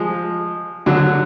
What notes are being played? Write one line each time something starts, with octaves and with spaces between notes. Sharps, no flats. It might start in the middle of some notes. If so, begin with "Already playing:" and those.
Already playing: F3 G#3
D3 F#3